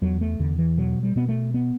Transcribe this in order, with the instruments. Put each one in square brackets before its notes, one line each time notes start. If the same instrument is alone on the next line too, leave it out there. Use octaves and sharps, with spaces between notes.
[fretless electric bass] E2 F#3
A3
E2 D3
E3
B2 F#3
G3
B2 B3
A3
B3